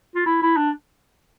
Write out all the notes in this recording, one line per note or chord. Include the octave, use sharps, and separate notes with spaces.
F4
E4
E4
D4